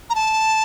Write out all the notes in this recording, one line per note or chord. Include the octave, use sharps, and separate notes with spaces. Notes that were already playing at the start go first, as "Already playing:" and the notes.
A#5
A5